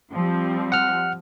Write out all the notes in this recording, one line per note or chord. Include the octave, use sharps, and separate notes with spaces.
F3 G3 C4
F#5 F6